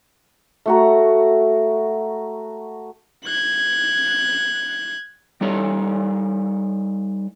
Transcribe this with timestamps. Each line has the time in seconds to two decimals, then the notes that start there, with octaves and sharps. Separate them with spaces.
0.66 A3 F#4 A#5
3.25 F#6 G#6
5.41 G3 D#4 A4 C#5